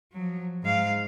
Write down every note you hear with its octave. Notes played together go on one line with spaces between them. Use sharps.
F3 F#3
G#2 F5